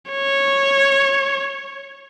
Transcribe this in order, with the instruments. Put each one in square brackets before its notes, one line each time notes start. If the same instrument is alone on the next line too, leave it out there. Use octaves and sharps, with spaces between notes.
[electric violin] C#5